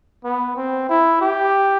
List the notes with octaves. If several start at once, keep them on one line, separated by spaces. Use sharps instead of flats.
B3
C4
E4
G4